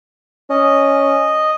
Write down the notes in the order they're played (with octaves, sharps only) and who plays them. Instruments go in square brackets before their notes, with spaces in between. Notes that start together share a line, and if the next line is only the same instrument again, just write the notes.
[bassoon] C#4 [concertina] D#5